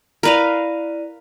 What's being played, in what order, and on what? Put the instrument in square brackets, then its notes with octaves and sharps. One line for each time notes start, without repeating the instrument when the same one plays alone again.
[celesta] E4 D5 D#7 [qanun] A#4 B4 F5